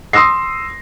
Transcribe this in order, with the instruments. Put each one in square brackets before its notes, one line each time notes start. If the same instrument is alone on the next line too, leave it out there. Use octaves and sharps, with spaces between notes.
[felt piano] C6 D#6 E6 A#6 C7